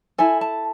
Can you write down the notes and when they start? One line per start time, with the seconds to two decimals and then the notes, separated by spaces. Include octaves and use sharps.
0.18 E4 A4 G#5
0.41 A5